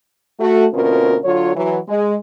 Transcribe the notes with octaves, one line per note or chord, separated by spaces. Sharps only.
A3 F#4
D2 B2 C4 C#4 F4 A#4
D3 F#3 F4 C#5
E3 F#3
G#3